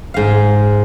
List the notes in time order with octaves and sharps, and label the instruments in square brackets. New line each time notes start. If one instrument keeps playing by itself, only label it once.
[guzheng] G#2 F5